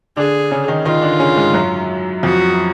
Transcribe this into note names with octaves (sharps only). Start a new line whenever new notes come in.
D3 D4 G#4
C#3 C#4
D#3 D#4
D#3 D#4 F4
D3 D4
C#3 C#4
G#2 G#3
F#2 F#3
F2 F3 F#4